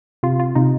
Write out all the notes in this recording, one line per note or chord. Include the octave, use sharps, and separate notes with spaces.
C3 F4
F4
C3 D#4